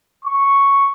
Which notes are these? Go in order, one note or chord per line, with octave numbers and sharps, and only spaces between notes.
C#6